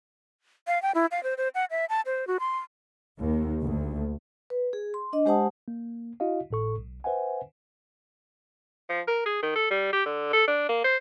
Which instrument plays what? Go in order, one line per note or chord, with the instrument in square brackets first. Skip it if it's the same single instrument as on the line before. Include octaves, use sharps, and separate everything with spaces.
[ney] F5
G5
E4
F5
C5
C5
F#5
E5
A5
C5
F#4
C6
[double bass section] D#2
D2
[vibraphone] B4
G#4
C6
D4 D#5
G#3 G4 C5 F#5 A5 D#6
[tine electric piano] A#3
E4 F#4 D#5 F5
G#1 A2 A4 C#6
B1
B4 C5 E5 F#5 G#5
[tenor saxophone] F3
A#4
G#4
D#3
A4
G3
G4
D3
A4
D4
A#3
C5